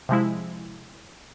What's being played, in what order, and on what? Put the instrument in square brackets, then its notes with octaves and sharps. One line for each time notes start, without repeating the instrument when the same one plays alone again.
[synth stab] C3 F3 G#3 E4